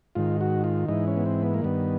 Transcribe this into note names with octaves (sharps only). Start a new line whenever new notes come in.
G#2 D#3 F4
F#4
F4
G#2 E3 D#4
C#4
B3
C4
B3
A#3
G2 D#3 B3